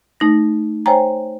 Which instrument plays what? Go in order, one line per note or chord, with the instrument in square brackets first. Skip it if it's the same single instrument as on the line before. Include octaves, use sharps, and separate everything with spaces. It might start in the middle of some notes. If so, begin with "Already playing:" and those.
[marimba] A3 D#4 A#6
C5 C#5 G5 G#5 A#5